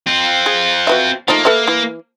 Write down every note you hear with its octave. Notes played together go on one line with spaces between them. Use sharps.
C4 F4
G#4
F#4 B4 E5
F3 A3 A#3 D#4
A4 B4 E5
E3